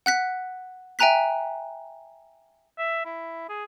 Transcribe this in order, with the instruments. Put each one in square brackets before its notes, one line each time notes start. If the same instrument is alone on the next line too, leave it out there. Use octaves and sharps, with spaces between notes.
[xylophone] F#5 F#6 B6
E5 G5 G#5 A#5 F#6 B6
[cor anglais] E5
E4
G#4